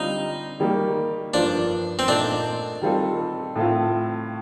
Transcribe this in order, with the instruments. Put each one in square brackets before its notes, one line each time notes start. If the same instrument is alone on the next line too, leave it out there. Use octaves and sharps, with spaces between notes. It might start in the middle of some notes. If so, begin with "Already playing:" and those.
Already playing: [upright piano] D3 G3 C4 F4 [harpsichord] D#4
[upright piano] D#3 G3 A#3
[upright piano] G2 F3 A#3 F4 C5 [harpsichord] D4
[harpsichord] C4
[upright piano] A#2 A3 D#4 A4 [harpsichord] D4
[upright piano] D#3 G3 C4 F4 A4
A2 A3 C4 F4